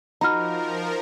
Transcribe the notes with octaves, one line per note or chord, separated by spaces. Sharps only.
F3 D#4 F#4 A#4 A#5 B5 F6